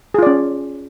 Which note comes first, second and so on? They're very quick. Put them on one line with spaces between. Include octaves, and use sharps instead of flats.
G#4 F4 D5 C#4